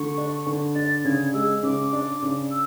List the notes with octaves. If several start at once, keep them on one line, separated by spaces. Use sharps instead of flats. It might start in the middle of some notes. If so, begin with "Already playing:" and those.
Already playing: D3 A3 C#6
D4
D3
D4 A6
C#3 G#6
G#3 E6
C#3 D6
D4
C#3
E6